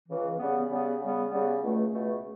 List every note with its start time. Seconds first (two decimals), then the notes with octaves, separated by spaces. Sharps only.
0.09 C#2 C#3 E3
0.39 C#3 G3 B3
0.69 C#3 G3 B3
1.00 C#3 G3 B3
1.30 C#3 G3 B3
1.61 C#2 B2 A3
1.91 C#2 B2 A3